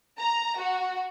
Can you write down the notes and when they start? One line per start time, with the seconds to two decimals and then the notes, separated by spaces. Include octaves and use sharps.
0.19 A#5
0.60 F#4